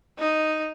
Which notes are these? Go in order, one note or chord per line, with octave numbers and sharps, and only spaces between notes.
D#4